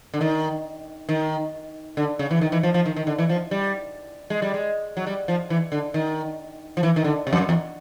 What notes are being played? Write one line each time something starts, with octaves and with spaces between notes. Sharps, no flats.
D3
D#3
D#3
D3
C#3
E3
D#3
E3
F3
F3
D#3
D#3
D3
E3
F3
G3
G#3
G3
G#3
F#3
G3
F3
E3
D3
D#3
F3
E3
D#3
D3
C3
F2
F#2
E2